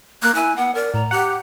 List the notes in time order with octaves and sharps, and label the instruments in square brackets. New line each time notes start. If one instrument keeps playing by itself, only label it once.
[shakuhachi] A#3 [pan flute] F#6
[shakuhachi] E4 [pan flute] G#5
[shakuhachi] B3 [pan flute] F#5
[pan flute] A#4 [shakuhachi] D5
[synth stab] A2 [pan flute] A#5
[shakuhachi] G4 [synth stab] F#5